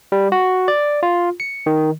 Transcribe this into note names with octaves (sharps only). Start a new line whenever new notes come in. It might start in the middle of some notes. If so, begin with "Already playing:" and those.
G3
F#4
D5
F4
C#7
D#3